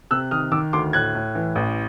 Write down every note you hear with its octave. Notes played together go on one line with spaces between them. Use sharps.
C3 E6 F#6
D#3 D#6 F6
D#3 D6 E6
D2 C6 D6
A2 F#6 G#6
A2
E3
A1